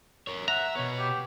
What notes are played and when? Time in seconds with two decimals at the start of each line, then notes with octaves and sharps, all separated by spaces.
0.27 A#4 C#5
0.48 E5 F#5 A#5
0.75 B2 B3 C#5
0.99 G4